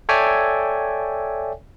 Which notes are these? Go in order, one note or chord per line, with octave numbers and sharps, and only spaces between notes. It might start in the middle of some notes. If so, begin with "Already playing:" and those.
A4 C#5 D5 E5 G5 G#5